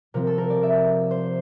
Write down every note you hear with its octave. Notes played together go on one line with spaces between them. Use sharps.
C3 F3 C4 A#4
A4
A#4
D5
E5
C5